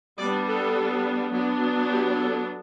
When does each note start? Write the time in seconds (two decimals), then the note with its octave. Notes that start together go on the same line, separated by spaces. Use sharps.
0.20 G3 B3 D4 D5
0.48 A4
1.33 F#3 B3 D4
1.89 G4
2.18 A4